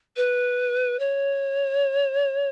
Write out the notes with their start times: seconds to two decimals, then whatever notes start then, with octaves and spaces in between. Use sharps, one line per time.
0.16 B4
0.99 C#5